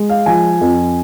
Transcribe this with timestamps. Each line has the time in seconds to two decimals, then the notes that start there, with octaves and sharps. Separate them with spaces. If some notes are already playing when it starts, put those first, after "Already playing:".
Already playing: G#3
0.09 F5
0.26 F3 G#5
0.61 F2